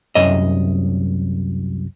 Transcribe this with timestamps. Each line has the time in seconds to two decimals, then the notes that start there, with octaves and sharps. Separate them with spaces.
0.15 C2 F#2 D#5